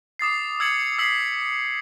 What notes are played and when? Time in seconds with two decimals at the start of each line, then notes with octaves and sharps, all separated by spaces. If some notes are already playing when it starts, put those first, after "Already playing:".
0.19 D6 D#6 A6 C7
0.60 E6 G#6 A6 C#7 F#7
0.99 E6 B6 C7 F#7